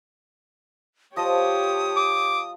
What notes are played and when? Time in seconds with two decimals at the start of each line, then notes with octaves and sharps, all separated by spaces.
1.16 F3 G4 C#5 D#5 A5 D#6
1.97 D6